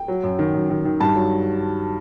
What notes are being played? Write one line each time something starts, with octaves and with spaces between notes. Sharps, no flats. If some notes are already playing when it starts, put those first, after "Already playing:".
Already playing: G5
F#3
F#2
D#3
F#2
D#3
D#3
G2 A5
F#3